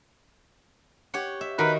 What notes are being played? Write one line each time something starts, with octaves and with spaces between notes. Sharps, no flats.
G4 C#5 F#5
E5
D#3 D#4 F#4 A#4 B4